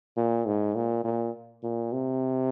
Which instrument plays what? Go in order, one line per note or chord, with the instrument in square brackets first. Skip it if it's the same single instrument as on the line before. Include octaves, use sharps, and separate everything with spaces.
[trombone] A#2
G#2
A#2
A#2
A#2
C3